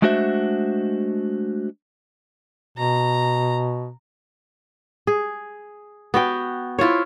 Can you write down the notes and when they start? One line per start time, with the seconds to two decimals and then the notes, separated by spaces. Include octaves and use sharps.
0.02 G#3 A3 D4 F#4 C5 E5
2.77 B2 A#5
5.07 G#4
6.14 B3 F#4 G5
6.79 E4 F4 C5 C#5